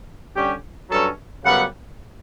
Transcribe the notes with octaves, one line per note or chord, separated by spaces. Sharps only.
D3 G3 C#4 G4
G2 F#3 C#4 A4
F#2 C#3 G3 B3 F#5